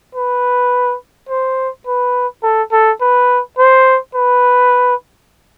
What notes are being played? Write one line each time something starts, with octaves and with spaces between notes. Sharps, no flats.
B4
C5
B4
A4
A4
B4
C5
B4